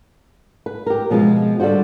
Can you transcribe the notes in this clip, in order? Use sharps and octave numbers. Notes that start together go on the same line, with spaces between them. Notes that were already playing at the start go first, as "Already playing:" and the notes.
B4
G4 A#4
B2 F3 G#3 C4 F4
D3 G3 F4 F#4 C5